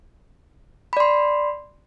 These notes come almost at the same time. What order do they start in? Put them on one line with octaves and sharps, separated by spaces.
B5 D5 C6